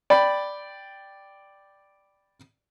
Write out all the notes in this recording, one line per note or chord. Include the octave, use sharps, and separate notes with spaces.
D5 G5 B5